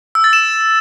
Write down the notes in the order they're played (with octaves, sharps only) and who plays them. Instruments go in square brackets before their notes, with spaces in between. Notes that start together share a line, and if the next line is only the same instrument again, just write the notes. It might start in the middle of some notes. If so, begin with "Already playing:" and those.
[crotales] E6
A6
E7